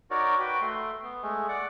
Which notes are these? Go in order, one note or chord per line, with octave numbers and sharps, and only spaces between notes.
D#4 F#4 A#4 C#5 D5
F#4 B4 G5
A3 C6
B3
G#3 A3
D5 F#5